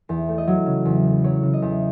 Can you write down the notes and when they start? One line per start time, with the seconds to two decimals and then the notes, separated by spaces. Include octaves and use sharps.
0.09 E2
0.28 A3
0.38 D#5
0.47 F#3
0.66 C#3
0.85 E2
1.04 A3
1.24 F#3 C#5
1.43 C#3
1.53 D#5
1.62 E2